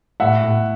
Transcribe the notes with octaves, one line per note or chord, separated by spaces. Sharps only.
A2 E5 F#5
A2